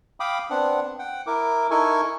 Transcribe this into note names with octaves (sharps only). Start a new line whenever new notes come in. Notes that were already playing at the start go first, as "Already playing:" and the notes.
F5 G5 B5 D6 D#6
B3 C4 D4 F#5
F#5 G5
E4 A#4 D6
D#4 E4 A4 A#4 G#5 C#6